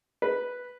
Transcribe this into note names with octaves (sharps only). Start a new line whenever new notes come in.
B4